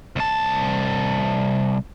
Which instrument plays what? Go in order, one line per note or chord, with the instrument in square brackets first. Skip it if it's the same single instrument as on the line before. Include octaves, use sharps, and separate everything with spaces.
[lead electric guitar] C2 A5